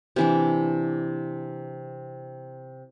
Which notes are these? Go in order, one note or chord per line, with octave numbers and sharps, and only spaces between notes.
C3 E3 D4